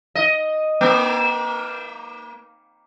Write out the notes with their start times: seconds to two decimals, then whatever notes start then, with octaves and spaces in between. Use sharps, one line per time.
0.15 D#5
0.81 A#3